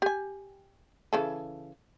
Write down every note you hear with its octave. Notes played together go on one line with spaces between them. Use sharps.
G4 G#5
C#3 E3 A4